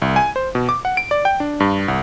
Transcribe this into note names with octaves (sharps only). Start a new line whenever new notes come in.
C2
G#5
C5
B2
D6
F#5
D7
D5
G5
D4
G2
C2